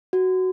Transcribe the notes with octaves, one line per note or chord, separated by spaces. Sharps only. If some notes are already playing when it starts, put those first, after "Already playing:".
F#4